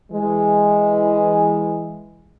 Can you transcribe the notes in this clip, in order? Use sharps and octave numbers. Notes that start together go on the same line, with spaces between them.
E3 G#3